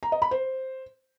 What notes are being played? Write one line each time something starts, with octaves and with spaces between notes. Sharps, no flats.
A#5
D#5
B5
C5